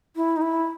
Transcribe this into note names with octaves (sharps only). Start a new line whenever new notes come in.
E4
D#4
E4